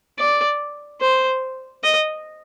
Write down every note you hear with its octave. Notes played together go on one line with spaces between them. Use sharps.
D5
C5
D#5